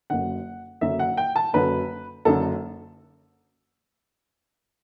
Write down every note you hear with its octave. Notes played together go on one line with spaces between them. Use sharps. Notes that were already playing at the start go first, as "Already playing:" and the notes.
F#1 F#2 D3 F#5
F#1 F#2 D3 E5
F#5
G5
A5
F#1 F#2 D3 B4
F#1 F#2 D3 A4